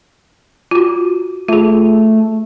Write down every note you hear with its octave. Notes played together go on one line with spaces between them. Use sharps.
F4 F#4
A3 F4 G#4